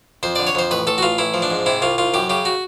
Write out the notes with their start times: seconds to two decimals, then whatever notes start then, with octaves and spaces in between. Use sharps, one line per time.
0.23 F2 C5
0.36 D3 D5
0.47 C#5
0.55 F2 C5
0.71 A1 B4
0.87 A1 A4
0.98 F#4
1.02 A1 F4
1.18 A1 E4
1.34 F3
1.42 D4
1.51 G#2
1.66 C3 E4
1.82 C2 F4
1.98 C2 F4
2.14 F#2 G4
2.29 C#3 G4
2.45 F#4